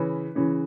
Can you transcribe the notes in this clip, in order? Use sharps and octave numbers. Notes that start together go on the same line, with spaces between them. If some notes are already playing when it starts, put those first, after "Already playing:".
Already playing: C#3 E3 C#4 B4
C#3 E3 C#4